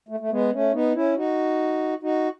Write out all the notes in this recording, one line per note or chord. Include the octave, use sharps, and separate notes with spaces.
A3
A3
G#3 B3
A3 C#4
B3 D#4
C#4 E4
D#4 F#4
D#4 F#4